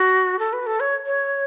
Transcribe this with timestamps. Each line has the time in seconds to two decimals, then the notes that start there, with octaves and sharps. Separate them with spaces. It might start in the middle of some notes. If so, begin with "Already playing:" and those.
Already playing: F#4
0.39 A4
0.53 B4
0.67 A4
0.80 C#5
1.06 C#5